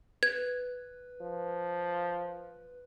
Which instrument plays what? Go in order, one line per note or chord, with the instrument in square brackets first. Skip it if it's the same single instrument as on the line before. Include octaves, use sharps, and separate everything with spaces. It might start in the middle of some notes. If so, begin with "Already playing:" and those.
[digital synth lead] B4 [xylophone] G#6
[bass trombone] F3